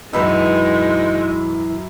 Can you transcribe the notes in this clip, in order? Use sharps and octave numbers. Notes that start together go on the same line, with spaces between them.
F#2 B2 E3 G#3 B3 D#4 B5 E6